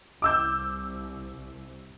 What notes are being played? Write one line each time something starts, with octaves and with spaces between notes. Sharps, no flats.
C2 D6 E6 G6